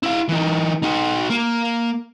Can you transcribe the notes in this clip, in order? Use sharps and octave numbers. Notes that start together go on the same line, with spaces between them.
E4 F5
E3 D#4
D#4 F#4
A#3